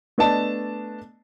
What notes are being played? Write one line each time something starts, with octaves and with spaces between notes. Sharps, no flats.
A3 B3 D4 D#5 A5